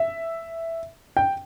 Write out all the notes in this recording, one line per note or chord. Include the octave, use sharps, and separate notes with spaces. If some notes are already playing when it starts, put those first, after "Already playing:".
Already playing: E5
G5